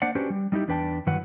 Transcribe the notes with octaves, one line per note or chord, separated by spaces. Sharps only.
A#3 D4 C5 D5 F#5
C#4 D4 F#4 G4 B4 C5
G3
G3 D#4 E4 G4
E2 D4 B4 G5 A5
G2 D#3 F#3 E4 B4 F#5